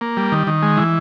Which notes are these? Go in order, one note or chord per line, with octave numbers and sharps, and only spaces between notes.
A#3
G3
D#3
D#3
G#3
E3